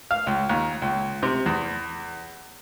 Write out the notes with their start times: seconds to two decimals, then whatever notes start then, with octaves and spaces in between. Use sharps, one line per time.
0.11 F5
0.27 C#2
0.49 D#2
0.82 C#2
1.23 C3
1.46 E2